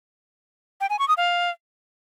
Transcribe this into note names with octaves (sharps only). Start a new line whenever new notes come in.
G5
G#5
C#6
D#6
F5